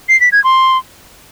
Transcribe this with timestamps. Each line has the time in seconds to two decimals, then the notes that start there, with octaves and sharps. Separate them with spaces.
0.09 C7
0.21 B6
0.32 G#6
0.44 C6